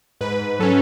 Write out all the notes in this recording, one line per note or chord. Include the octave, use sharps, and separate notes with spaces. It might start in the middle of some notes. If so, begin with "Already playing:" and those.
G#2 B4
F#3 C#4 A4